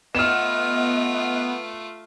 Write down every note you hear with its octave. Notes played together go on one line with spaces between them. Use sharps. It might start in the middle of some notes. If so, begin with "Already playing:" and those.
A3 B3 F4 D#5 F6 E7